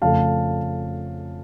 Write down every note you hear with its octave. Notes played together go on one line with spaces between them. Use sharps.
F2 C#3 A3 F5 A5